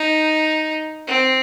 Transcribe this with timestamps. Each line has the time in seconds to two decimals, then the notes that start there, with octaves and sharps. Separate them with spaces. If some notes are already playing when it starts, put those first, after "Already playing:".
Already playing: D#4
1.08 C4